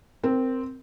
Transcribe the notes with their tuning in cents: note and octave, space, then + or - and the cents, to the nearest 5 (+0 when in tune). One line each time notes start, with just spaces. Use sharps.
C4 -5 A#4 +0